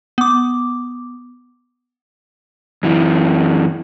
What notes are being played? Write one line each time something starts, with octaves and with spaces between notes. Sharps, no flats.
B3 D6
F#2 E3